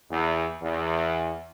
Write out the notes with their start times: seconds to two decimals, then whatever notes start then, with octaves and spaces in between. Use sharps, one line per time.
0.11 E2
0.62 E2